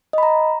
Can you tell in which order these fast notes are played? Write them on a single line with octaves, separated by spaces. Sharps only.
D#5 B5 A#5